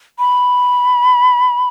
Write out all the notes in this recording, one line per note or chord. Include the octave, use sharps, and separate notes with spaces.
B5